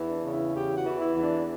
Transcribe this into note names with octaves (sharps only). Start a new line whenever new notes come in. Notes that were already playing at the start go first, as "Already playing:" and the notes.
Already playing: E2 E3
D4
C#3
E4
E2 G4
F#4
E3
E4
E2
D4